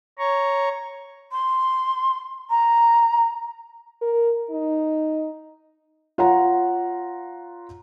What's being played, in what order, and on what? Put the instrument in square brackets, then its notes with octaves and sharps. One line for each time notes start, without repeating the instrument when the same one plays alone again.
[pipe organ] C#5 A#5 C#6
[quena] C6
A#5
[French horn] A#4
D#4
[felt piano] F4 C#5 F#5 A#5